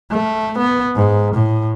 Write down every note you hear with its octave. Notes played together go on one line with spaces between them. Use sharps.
A3
B3
G#2
A2